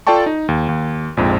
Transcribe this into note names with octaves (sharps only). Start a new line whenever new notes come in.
F4 A4 D5 G5 A5 C#6
D#4
D#2
D#2
A#1 F2 G#2